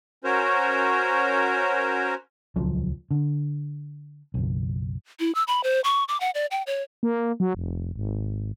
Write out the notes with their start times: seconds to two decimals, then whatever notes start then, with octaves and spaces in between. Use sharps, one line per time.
0.24 C#4 F#4 A#4 C5 C#5
2.56 D#1 C#2 F3 F#3
3.11 D3
4.34 F#1 B1
5.20 E4
5.35 E6
5.47 B5
5.64 C5
5.84 C#6
6.08 D6
6.20 F#5
6.35 D5
6.51 G5
6.67 C#5
7.03 A#3
7.40 F#3
7.55 F1
7.96 G#1